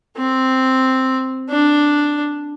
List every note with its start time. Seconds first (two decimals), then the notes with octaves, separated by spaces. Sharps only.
0.17 C4
1.50 D4